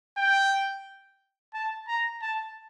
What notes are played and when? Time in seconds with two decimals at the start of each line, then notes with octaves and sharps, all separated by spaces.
0.17 G5
1.54 A5
1.88 A#5
2.22 A5